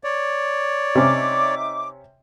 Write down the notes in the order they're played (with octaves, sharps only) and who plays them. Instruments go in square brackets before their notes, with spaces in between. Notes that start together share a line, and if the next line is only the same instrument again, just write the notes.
[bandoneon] C#5 D5
[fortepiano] C3 C#4 [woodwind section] D#4 E5 D6